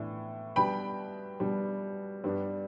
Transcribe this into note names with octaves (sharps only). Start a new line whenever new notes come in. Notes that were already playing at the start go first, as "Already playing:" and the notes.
Already playing: A2 E3 B3 D4
B2 G3 B3 D4 G5 B5
B2 G3 B3 D4
G2 G3 B3 D4